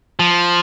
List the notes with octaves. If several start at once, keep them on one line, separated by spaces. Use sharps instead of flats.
F3